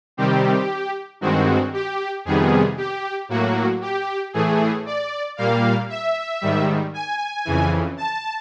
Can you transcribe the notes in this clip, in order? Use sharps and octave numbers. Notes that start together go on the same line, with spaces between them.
C3 D#3 G3 C4 G4
G2 D#3 G#3 C4 F#4
G4
F2 C3 D#3 G3 B3 G#4
G4
A2 F#3 A#3 F#4
G4
A2 E3 A3 G#4
D5
A#2 G3 A#3 F5
E5
G#2 D#3 G3
G#5
F2 C#3 E3
A5